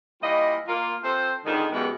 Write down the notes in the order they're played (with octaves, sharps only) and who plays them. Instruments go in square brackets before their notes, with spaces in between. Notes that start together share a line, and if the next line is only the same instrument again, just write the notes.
[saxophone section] E3 G3 A#3 F4 D#5
A#3 F4
C4 F4 A4 C5
F2 G#2 D3 D#3
F#2 B2 E3 G3 G#3 B3